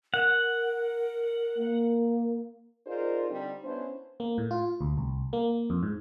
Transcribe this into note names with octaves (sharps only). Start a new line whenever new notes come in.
A#4 F#5
A#3
D#4 F4 G#4 A#4 C5 D5
D3 G3 C4 D#4
B3 C#4 D4 E4 C5
A#3
A2
F4
D2
C2
A#3
F2
G#2